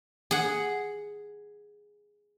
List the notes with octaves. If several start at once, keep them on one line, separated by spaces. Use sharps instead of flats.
G#4 F#5